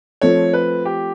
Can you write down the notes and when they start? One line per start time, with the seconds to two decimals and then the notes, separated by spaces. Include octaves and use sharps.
0.21 F3 A3 C4 C#5
0.53 B4
0.85 G4